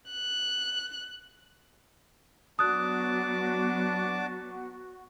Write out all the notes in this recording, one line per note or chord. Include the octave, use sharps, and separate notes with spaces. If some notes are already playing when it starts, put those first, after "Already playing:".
F#6
F#3 B3 D4 F#4 A5 D6 D#6 F#6